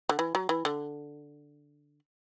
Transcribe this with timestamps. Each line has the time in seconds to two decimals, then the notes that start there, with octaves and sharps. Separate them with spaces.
0.09 D3
0.19 E3
0.35 F#3
0.49 E3
0.65 D3